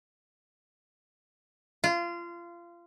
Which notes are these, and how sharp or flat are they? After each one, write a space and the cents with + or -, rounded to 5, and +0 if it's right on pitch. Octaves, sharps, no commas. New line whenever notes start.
F4 -25